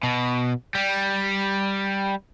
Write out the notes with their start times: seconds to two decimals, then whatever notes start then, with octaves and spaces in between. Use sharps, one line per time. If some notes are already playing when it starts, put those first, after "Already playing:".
0.03 B2
0.75 G3